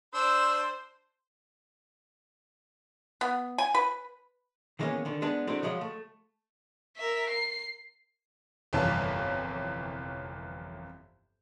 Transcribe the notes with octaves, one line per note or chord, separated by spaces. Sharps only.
D4 C5 E6
B3
G#5
B4
D#3 E3 G#3 A#3 B3 C#4
D3 D#3
G#3 B3 D4
F#3 G#3 A3 C4 D4 E4
C#3 F3 F#3 G#3
A3
A#4 E5
C7
G1 C2 F2 E3 C#5 A5